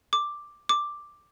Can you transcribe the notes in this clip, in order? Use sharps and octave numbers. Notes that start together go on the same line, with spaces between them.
D6
D6